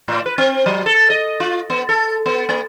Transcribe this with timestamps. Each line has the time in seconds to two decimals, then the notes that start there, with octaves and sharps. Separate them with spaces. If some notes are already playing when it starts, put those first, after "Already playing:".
0.08 A2
0.26 B4
0.38 C4
0.66 F#3
0.86 A4
1.10 D#5
1.40 F4
1.70 B3
1.89 A4
2.26 B3
2.49 A#3